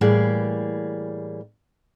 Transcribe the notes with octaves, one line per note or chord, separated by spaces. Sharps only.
A2 E3 G3 A#3 G#4